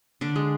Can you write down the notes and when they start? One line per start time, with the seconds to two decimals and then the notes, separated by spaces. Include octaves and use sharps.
0.21 D3 D4
0.36 G#3